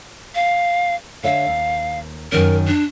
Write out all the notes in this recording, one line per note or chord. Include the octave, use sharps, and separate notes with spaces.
F5
D3 C#5 E5 F5
D#2
F#2 D#3 C#4 A#4
D4